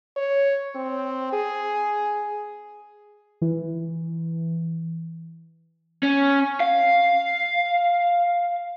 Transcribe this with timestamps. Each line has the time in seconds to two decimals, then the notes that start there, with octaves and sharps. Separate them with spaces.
0.16 C#5
0.75 C4
1.33 G#4
3.41 E3
6.03 C#4
6.60 F5